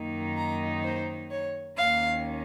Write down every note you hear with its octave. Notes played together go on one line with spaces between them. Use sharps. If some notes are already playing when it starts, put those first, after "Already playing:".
Already playing: F#2 D#3 A#3 D#4
A#5
C5
C#5
D#2 D#3 A#3 C#4 F5